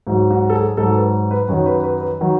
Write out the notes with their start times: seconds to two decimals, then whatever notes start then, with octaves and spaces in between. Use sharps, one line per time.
0.07 G#2 F#3 F#4
0.31 F#4
0.49 A4
0.55 G#4
0.77 G#2 F#3 A4
0.95 B4
1.31 B4
1.49 F#2 D#3 F#3 C#5
1.66 B4
1.83 B4
2.01 B4
2.21 D#3 F#3